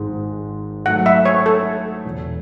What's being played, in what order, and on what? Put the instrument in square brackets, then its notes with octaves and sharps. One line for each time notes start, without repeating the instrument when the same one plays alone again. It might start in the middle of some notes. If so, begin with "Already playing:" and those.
Already playing: [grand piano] G#1 G#2 G#3
[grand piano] G#2 F#3 A3 [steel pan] F#5
[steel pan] E5
C#5
A4
[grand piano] E1 E2 B2